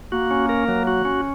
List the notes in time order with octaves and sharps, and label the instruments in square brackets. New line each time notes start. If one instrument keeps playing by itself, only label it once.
[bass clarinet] A#3 [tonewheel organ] F#4
[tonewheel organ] C#4
A#4
F#3
F#4
C#4